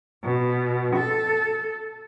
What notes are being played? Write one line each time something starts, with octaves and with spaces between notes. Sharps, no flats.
B2
A4